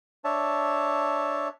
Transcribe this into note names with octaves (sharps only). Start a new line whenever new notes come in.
D4 C#5 E5 A5